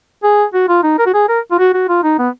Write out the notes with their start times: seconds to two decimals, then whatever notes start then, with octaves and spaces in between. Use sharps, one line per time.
0.23 G#4
0.54 F#4
0.68 F4
0.83 D#4
0.98 A#4
1.06 F#4
1.14 G#4
1.29 A#4
1.51 F4
1.59 F#4
1.74 F#4
1.88 F4
2.03 D#4
2.19 B3